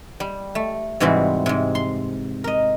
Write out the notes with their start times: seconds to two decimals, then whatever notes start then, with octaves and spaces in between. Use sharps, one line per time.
0.20 G3
0.55 A3
1.00 G#2 C3 E3 G3 C4 F#4
1.46 G#2 C3
1.75 C6
2.44 A#4 D#5